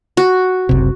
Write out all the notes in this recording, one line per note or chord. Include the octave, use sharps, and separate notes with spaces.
F#4
F#1 C#2 C3